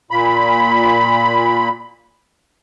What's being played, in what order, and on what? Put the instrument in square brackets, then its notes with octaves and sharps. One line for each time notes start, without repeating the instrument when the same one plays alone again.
[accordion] A#2 B5